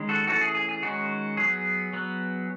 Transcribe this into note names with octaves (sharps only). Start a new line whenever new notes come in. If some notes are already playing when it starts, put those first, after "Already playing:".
Already playing: D#3 G#3 C#4
F#4 A4
E3 A3 C#4 F#4 A4
G#4
G#4
G#4
D#3 G#3 C#4 F#4
F#3 B3 G#4
F#3 B3